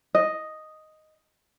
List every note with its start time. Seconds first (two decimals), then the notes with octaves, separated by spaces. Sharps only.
0.15 D#5